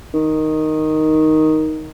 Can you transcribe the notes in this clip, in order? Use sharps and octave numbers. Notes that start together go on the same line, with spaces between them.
D#3